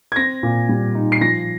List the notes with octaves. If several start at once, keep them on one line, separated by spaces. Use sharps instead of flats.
G#6
C4 A#6
A#2
G3
D#4
C7
F3 A#6